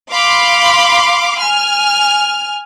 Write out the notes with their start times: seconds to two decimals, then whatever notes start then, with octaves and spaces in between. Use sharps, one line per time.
0.11 F5 B5 C6 D6
1.40 G#5 F6